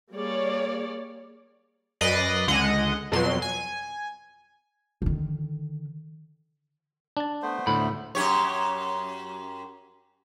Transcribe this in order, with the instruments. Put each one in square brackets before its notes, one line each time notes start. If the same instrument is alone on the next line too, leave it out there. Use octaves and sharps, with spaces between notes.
[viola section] G3 A#3 G#4 C#5 D5
[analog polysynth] F#2 B4 D5 D#5 A#6 C7
C#2 D3 G#3 D#5 F#5
F2 B2 F#3 C6
G#5
[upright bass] D3 D#3
[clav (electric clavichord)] D4 A5
[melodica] A3 B3 C5
[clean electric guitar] D2 B5 [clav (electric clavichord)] A2
[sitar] F#2 G4 C#5